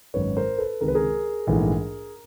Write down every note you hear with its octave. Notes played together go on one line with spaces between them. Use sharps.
G#1 F#2 D#3 B4 C#5
A#4 C5
A4 B4
C#2 C3 D#3 G#3 A#4
B4
G#4 A#4
A#1 G#2 E3 A3